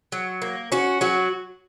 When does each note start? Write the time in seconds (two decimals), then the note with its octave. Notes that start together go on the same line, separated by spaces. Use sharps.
0.12 F#3
0.42 A#3
0.72 C#4 F#4
1.01 F#3 F#4